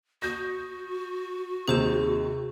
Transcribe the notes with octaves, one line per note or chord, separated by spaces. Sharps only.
F#4 D#6 G6 A#6
D#2 C3 D#4 G#4 C5 E7